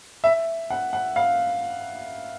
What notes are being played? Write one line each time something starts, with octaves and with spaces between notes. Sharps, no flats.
E5
F#5
F#5
F5